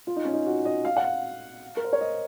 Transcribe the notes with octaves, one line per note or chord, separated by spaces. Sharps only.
F4
D#4
C#4
D#4
F#4
D#5
F5
F#5
F5
A#4
C5
C#5
D#5